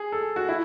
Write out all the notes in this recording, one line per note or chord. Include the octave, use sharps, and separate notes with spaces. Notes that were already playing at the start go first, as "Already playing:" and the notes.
Already playing: G#4
A4
F#4
E4